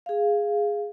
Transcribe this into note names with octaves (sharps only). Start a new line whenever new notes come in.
G#4 F5